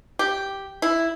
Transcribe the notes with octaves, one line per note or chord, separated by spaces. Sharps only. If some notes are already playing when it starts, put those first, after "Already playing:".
G4
E4